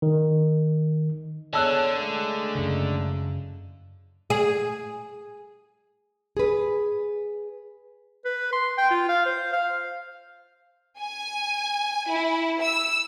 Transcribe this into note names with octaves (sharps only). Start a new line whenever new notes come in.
D#3
D3 B3 G#4 C#5 A5 E6 F#6
G#3 A3
F#2 C#3
G#4
G#4 B4
B4
C6
G5
F4
F5
C5
F5
G#5
E4
E6